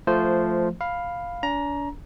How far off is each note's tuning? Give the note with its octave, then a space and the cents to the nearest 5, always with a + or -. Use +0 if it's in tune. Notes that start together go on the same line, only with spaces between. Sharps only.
F3 +0 A3 +0 C5 -10
F5 +5 B5 +0
D4 -40 A#5 +15